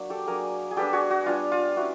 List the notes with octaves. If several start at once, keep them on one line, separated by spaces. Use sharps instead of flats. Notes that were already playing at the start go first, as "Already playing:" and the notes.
Already playing: F#3 A#3 D4
G4 A4
F#3 A#3 D4 G#4 A#4
G#4
G3 B3 D4 G4 A4
F#4 G#4
F#4
G3 B3 D4 F4
F4
C#4 E4 F#4